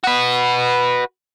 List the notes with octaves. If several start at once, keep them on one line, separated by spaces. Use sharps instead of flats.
F#4 B4